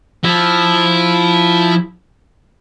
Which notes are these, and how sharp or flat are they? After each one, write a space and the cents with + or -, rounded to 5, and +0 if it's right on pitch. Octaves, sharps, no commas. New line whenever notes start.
F3 +0 E4 +0